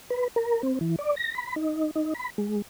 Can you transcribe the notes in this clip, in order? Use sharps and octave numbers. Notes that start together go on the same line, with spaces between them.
B4
A#4
C4
E3
D5
A#6
B5
D#4
D#4
B5
G#3